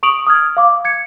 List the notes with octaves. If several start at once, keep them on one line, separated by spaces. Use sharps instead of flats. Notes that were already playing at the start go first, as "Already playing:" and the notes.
C#6 D#6 D7 F7 F#7
D#6 F6 G#6
F5 D6
G#6 C#7